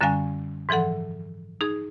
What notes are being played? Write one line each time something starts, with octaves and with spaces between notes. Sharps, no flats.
F#2 D3 G3 C#4 F5 G#5
G#2 E3 F3 A4 F#5
D#4 G#4